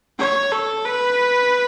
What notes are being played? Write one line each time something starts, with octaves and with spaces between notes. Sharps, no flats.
C#5
A4
B4